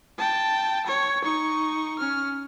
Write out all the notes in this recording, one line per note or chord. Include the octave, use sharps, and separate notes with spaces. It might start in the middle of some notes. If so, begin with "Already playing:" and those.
G5 A5
C#5
D#4 C#6
C#4 F6